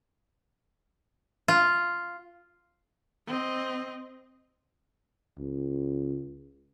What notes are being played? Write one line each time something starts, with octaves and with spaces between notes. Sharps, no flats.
F4
C4 D#5
C#2